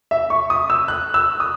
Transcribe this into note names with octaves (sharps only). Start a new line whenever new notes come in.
E5
C#6
D#6
E6
F#6
E6
D#6